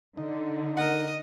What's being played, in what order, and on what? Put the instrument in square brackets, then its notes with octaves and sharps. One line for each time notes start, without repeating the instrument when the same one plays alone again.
[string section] D3 [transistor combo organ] D#4
[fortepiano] A#4 F#5 [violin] D#5